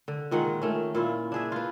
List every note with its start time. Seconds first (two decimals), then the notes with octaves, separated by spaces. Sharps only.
0.08 D3
0.31 A#2 D#3 G#3 F#5
0.62 D#3 A3 C#4
0.95 A#2 E4 F4
1.32 D4 G#4 E5
1.52 F4 B4